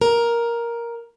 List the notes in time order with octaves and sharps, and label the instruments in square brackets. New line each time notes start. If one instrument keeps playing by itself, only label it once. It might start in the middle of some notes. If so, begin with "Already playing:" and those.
[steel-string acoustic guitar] A#4